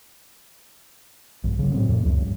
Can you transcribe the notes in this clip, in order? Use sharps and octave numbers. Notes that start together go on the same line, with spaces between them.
A#1 G2
C#3 F#3
A2 F#3 C4
F2 A#2 A3 A#3
C#2 F#2
G2 G3